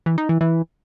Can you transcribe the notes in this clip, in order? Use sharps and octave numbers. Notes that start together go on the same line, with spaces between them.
E3
D#4
E3
E3